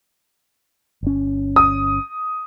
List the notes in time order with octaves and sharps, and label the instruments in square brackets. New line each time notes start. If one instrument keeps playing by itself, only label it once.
[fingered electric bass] G1 C#4
[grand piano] D#6